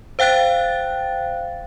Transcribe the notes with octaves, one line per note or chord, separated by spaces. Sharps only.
C5 F5 G5 F#6 A6